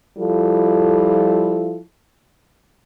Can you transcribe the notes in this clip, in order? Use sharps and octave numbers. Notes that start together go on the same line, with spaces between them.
F3 G3 E4 F4 A4